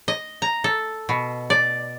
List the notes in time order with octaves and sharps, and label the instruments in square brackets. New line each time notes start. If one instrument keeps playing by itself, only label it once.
[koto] D#5
A#5
A4
B2
D5